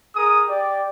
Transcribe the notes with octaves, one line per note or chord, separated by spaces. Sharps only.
G#4 A#4 D#6
G4 D5